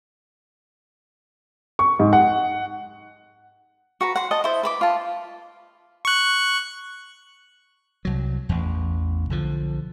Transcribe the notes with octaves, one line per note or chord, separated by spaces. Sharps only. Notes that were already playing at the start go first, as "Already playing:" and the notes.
C#6
G#2
F#5
F#4 B4 A#5
F#5 C6
D#5 F#5 A5
E4 C5
B4 B5 D6
F4 A5
C#6 F#6
C2 F#3
A1 E2
B1 D3 F3